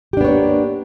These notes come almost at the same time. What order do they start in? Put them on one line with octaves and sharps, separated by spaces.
G4 D4 B3 C#5 A#3